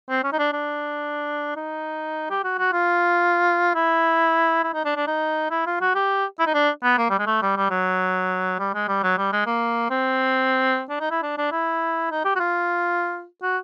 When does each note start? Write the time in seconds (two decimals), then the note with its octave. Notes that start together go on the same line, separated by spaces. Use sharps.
0.09 C4
0.24 C#4
0.32 D#4
0.39 D4
0.53 D4
1.56 D#4
2.30 G4
2.44 F#4
2.59 F#4
2.73 F4
3.75 E4
4.63 E4
4.74 D#4
4.85 D4
4.96 D4
5.07 D#4
5.51 E4
5.66 F4
5.81 F#4
5.95 G4
6.39 E4
6.47 D#4
6.54 D4
6.84 B3
6.98 A#3
7.10 G3
7.19 G#3
7.27 A3
7.42 G3
7.56 G3
7.70 F#3
8.59 G3
8.74 G#3
8.88 G3
9.03 F#3
9.18 G3
9.32 G#3
9.46 A#3
9.90 C4
10.90 D4
11.00 D#4
11.11 E4
11.22 D4
11.38 D4
11.52 E4
12.11 D#4
12.25 G4
12.36 F#4
12.40 F4
13.42 F#4